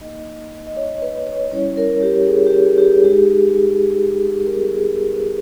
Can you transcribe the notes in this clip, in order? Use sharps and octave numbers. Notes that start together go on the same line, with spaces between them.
A#3 D#4 D#5
D#5
C#5
B4
C#5
G3 C#4 E4 C#5
A#4
G4
G#4
G4
G#4
G4
G#4
G#4
G#3 D#4 G4
A#4
G3 B3 D#4 G#4
G#4
A#4
B4